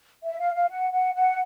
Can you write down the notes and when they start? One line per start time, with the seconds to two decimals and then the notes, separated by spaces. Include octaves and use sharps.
0.23 E5
0.38 F5
0.53 F5
0.68 F#5
0.91 F#5
1.14 F#5